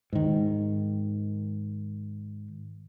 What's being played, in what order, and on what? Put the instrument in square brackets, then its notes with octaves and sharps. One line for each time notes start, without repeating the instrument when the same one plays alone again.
[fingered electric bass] G#2 D#3